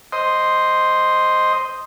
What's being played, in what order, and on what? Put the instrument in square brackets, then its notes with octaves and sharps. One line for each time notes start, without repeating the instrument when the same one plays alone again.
[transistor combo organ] C5 D#5